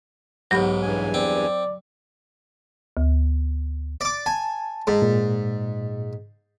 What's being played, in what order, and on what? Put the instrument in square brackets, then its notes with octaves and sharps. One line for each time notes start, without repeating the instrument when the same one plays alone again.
[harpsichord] B1 G#2 [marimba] F#3 G4 B5
[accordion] E2 G2 G#5
[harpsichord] C4 [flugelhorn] D5
[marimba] D2
[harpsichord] D5 D6
[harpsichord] G#5 [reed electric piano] A5
[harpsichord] G#2
[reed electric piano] A#2